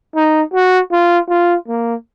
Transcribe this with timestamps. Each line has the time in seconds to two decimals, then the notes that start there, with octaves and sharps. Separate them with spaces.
0.15 D#4
0.53 F#4
0.92 F4
1.29 F4
1.68 A#3